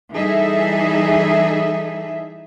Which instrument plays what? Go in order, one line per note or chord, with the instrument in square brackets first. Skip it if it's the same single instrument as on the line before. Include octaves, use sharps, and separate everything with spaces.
[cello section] E3 G3 D#4 G#4 A4 E5